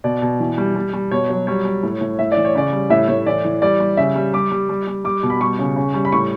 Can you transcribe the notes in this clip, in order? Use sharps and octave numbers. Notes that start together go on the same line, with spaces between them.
B2 D5
B2
E3
G3
G3
G3
B2 C#5
F#3
G3 C#5
G3
A2
A2
A2 E5
D5
E3
C#5
C#3 D5
G3
A2 E5
A2 C#5
E3 D5
E3
G3 D5
G3
C#3 E5
G3
G3 D6
G3
G3
G3
G3 D6
B2
B5
G3 C#6
C#3
C#3
G3
B5
A2 C#6